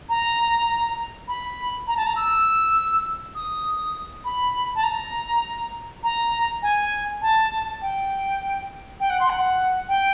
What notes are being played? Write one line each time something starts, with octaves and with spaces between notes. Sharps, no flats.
A#5
B5
A#5
A5
A#5
E6
D#6
B5
A5
A#5
A#5
G#5
A5
G5
G5
F#5
C6
F#5
G5